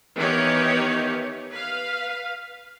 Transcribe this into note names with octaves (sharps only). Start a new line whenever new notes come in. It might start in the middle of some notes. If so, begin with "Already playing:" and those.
D#3 E3 B3 D#4 G4 C#5
B4 F5